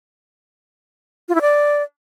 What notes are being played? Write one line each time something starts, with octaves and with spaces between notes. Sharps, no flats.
F4
E4
D5